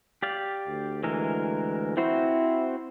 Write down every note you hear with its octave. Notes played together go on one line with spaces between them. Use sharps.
G4 D5 F5
D2
E3 G#3 A#4
C4 E4 F#4 C5